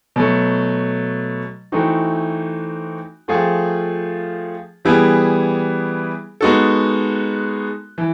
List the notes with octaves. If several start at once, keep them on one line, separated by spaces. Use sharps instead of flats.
B2 F#3 A3
E3 A3 C4 D#4 F#4
F3 A3 C4 F4 G#4
E3 G3 B3 E4 G#4
G#3 B3 D#4 F#4 A4
E3